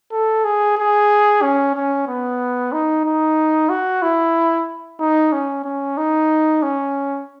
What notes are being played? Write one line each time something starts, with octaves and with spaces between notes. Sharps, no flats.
A4
G#4
G#4
C#4
C#4
B3
D#4
D#4
F#4
E4
D#4
C#4
C#4
D#4
C#4